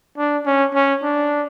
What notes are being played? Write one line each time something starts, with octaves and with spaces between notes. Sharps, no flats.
D4
C#4
C#4
D4